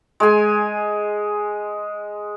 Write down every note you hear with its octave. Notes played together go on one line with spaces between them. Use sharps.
G#3 G#5